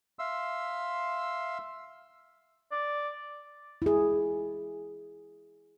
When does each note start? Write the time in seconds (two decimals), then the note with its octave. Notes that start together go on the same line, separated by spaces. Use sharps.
0.19 E5 F5 C6 E6
2.72 D5
3.82 E4 G#4